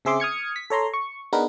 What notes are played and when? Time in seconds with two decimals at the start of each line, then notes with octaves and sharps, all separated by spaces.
0.05 C#3 C4 G#4 E5 C6 D6
0.20 D#6 F6 G#6 C#7
0.56 B6
0.70 A4 C#5 A#5 C6
0.94 C#6
1.33 B3 D4 D#4 G#4 A#4 B4